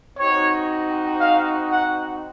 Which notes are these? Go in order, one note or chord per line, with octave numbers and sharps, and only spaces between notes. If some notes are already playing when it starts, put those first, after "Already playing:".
C4 D#4 F#4 C#5
F5
F#5